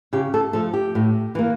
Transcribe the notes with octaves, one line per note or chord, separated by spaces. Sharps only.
C#3 G4
A4
F3 A3 A4
G4
A2
E3 A#3